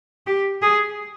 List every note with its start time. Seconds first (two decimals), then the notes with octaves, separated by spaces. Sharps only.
0.27 G4
0.62 G#4